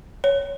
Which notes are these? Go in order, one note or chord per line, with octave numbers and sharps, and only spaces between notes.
C#5